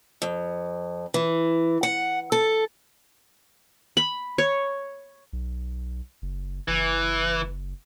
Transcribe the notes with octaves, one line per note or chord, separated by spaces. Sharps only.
F2
E3
F#5
A4
B5
C#5
B1
F#1
F#1 E3